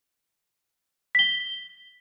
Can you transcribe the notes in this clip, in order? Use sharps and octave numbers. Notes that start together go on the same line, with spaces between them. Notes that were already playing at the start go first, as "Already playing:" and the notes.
B6 G7